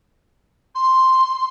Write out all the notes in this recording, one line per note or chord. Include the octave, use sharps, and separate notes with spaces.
C6